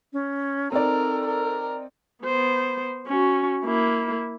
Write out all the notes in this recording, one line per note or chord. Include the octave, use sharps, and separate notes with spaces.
C#4
C4 D#4 A4 A#4 D5
A#4
B3 C5
C#4 F#4
A#3 E4